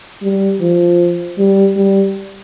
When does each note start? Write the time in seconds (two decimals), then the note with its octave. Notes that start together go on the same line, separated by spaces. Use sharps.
0.22 G3
0.60 F3
1.38 G3
1.76 G3